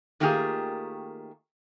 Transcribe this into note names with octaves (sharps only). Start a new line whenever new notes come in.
D#3 A3 A#3 F4 G4 G#4